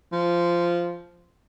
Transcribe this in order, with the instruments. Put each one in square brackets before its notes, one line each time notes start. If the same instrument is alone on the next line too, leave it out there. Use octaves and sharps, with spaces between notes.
[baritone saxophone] F3